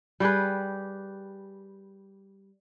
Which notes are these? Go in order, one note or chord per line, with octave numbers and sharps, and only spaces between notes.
G3 G4 G#4 B4